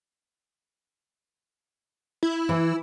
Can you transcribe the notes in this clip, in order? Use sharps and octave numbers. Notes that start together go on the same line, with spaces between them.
E4
E3